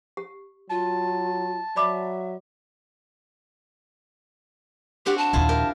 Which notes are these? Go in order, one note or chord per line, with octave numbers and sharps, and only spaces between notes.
G4
F#3 F4 A5
F#3 D5 E5 B5 D6
C4 D4 F#4 G4
A5
A#1 D#2 E4 F4
G4 A#4